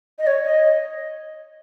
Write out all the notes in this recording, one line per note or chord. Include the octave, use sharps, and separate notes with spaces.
D#5
C#5
D#5